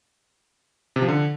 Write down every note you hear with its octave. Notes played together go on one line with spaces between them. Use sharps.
C3
F3
D3